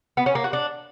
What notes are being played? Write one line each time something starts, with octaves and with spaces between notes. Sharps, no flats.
B3
C#4
A#3
F#4
D4